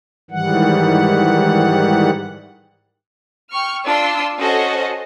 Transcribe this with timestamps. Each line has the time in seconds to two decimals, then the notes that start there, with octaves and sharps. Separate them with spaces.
0.31 G#2 D#3 E3 G3 F#5
3.52 G5 C#6 F6
3.87 D4 F4 A5 C6 E6
4.38 C#4 F#4 A4 C5 D#5 A5